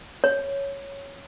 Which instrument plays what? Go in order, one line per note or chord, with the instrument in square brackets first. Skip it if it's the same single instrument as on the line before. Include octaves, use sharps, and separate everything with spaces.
[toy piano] C#5